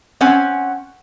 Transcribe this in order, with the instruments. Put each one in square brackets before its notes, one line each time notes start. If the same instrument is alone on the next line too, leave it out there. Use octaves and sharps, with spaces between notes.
[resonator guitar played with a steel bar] C4 C#4 F#5 G#5